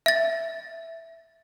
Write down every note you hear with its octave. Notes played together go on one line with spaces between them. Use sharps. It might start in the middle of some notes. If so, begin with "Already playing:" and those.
E5 A6